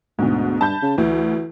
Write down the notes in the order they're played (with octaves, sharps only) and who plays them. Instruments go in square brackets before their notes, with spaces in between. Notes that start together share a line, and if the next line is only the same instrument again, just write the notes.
[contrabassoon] D2 [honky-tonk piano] G#2 B2
[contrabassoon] G2 [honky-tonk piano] A5 B5 G6
[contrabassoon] C#3
[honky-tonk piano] D2 [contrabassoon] E3